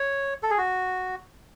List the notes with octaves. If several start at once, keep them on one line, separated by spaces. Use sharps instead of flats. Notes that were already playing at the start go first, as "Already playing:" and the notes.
Already playing: C#5
A4
G#4
F#4